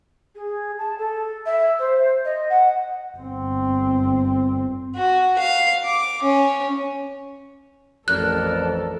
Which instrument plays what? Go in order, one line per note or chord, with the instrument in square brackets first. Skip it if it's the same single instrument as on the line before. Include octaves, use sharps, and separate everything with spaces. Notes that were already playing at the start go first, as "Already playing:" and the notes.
[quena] G#4
A5
A4
E5
C5
D#5
F#5
[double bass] G1 C4
[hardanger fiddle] F#4
F5
D6
C#4
[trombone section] A1 F2 [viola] A4 [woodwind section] A#4 D5 [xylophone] F#6